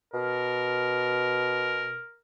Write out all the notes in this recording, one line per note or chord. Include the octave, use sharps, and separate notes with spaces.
B2 A#4